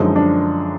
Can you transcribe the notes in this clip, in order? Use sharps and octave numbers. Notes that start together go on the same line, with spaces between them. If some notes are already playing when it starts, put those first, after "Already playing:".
Already playing: F#2 D3 F3 G#3 D#4
D4